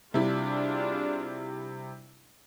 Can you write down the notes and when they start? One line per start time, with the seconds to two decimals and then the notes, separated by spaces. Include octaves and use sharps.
0.14 C3 G3 D4 E4 F4 G#4